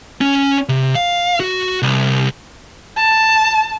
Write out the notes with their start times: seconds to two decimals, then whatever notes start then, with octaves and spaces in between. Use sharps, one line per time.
0.21 C#4
0.69 C3
0.95 F5
1.40 F#4
1.82 C2
2.97 A5